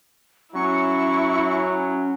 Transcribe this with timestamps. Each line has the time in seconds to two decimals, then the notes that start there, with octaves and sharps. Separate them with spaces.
0.55 F#3 C#4 E4 C#6